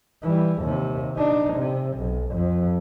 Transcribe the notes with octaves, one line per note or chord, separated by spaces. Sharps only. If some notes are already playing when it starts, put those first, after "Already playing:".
E3 G3
D#2 C3
D4 D#4
C3
B1
F2